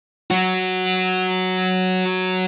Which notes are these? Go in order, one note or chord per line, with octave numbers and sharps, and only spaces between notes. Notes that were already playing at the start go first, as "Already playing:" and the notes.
F#3 F#4